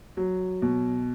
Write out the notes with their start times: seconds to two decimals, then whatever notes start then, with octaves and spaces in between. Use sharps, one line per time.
0.17 F#3
0.62 B2